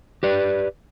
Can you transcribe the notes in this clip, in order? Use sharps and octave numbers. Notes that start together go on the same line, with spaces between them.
G4 B4 D5